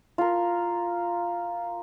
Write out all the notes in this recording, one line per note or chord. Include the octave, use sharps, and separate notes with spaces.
F4 A#4